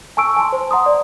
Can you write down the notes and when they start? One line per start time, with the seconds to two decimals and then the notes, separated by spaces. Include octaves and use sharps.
0.17 G#5 A5 C#6 E6 D7
0.36 G#5 A5 C6
0.52 C5
0.71 F#5 A#5 C6 D#6
0.86 D5